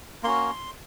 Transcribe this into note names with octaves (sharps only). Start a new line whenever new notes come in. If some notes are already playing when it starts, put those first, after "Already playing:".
A#3 C#4 F#4 C6